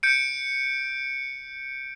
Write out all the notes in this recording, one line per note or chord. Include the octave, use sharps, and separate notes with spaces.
G6 C#7 D7